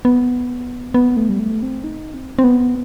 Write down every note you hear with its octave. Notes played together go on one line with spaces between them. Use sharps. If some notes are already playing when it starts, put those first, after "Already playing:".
B3
B3
A3
G3
A3
C4
D#4
C4
C4
B3